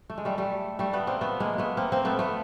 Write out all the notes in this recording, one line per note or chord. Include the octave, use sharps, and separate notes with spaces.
A3
G#3
G3 A3
G3 A3
G3 A3
A3 B3
A#3 C4
A3 B3
G#3 A#3
A3 B3
A#3 C4
A#3 C4
A3 B3
A3 B3